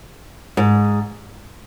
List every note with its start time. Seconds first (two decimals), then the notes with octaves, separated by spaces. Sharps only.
0.57 G#2